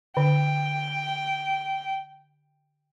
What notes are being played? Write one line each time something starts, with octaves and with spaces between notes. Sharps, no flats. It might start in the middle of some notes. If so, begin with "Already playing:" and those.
D3 G5